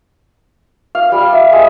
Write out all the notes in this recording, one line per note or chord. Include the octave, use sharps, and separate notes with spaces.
F5
G3
E5
G#3